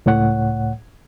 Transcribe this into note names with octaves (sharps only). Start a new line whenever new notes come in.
C#2 A2 C#5 F#5